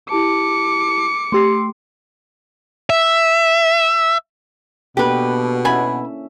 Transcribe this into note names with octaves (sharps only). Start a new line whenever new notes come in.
E4 G4 A5 D6 C#7
A3 G4 C6 E6 C7
E5
B2 A#3 D4 G4 A4 B4
B3 C#4 E4 E5 G#5 B5